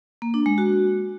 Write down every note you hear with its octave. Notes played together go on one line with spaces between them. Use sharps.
A#3
D4
G#3
F#4